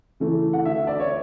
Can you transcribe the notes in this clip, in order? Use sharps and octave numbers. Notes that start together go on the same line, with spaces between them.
C#3 E3 A3
F#5
D2 E5
D5
C#5